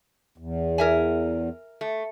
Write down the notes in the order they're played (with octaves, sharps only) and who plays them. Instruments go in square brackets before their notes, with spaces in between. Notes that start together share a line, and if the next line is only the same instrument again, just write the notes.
[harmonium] E2
[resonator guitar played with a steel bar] A#4 E5 G#5
A3